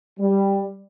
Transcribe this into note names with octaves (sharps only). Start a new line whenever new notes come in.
G3